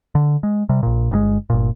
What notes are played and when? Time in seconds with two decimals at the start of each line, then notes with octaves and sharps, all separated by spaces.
0.15 D3
0.43 G#3
0.69 C3 G3
0.83 A#1 A#2
1.11 G1 B2 G#3
1.50 G1 A#2